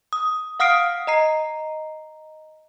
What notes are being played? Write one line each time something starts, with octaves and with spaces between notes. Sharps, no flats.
D#6
F5 F#5 D#6 F6 C7 D7
D#5 A#5 C7